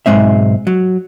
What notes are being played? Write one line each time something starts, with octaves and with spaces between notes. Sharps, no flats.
B1 F2 G#2 G#3 C4 E5
F#3